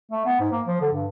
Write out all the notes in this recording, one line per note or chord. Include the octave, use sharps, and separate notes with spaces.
A3
B3
G#2
A#3
F3
D3
G2